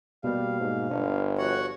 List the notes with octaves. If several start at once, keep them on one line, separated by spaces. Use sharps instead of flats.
B2 G3 A#3 F5
G#2
G1 D4
F3 F#4 C#5 F#5